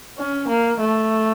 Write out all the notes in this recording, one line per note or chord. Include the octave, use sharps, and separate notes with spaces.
C#4
A#3
A3